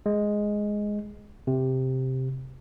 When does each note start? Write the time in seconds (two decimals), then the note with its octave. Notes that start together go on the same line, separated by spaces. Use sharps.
0.06 G#3
1.47 C3